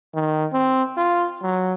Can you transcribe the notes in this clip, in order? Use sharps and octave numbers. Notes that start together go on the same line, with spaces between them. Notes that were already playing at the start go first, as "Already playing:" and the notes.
D#3
C4
F4
F#3